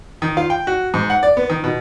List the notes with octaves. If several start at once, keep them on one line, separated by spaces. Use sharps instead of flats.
D#3
F4
G5
F#4
G#2
F#5
D5
B3
D#3
B2